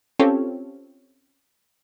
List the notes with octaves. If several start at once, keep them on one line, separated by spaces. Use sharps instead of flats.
C4 C#4 F4 G4 A4 C#5